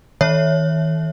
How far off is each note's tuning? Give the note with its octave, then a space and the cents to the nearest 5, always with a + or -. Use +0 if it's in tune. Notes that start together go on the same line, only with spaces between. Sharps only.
D#3 +45 C#5 +0 E5 +0